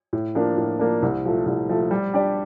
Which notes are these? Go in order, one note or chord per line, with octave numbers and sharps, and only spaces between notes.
A2
F3 A#3 D4
A2
F3 A#3 D4
C2
A#2 F3 A3
C2
A#2 F3 A3
G3
D4 G4 D5